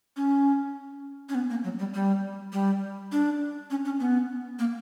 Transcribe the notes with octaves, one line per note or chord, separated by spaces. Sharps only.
C#4
C#4
B3
A#3
F#3
G3
G3
G3
D4
C#4
C#4
B3
A#3